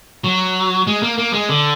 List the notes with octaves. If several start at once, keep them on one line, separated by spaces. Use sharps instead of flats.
F#3
G#3
A#3
A#3
G#3
D3